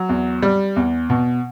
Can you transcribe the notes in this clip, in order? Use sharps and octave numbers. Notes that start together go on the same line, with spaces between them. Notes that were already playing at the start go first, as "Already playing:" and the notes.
Already playing: F#3
E2
G3
E2
B2